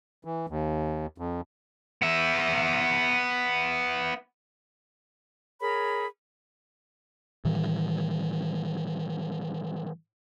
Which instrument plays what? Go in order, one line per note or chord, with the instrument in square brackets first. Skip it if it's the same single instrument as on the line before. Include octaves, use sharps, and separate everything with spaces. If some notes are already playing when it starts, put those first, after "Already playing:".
[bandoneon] E3
D#2
F2
[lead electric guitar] B3 E5
[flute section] G#4 A#4 C#5 B5
[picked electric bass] A2 D#3 E3 G3